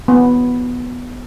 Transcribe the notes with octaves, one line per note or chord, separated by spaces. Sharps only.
B3